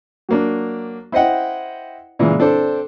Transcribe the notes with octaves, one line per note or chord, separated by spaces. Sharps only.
F#3 A#3 D4
E4 C5 D#5 F#5 G5
A#2 C#3 E3 G#3
C4 D4 A4 C5